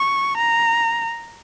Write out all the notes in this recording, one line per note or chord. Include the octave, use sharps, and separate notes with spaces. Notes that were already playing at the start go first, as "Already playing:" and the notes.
Already playing: C#6
A#5